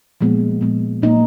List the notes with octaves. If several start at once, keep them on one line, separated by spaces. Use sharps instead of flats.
A#2 F3 G#3 B3
A#2 F3 G#3 B3
A#2 F#3 A#3 D#4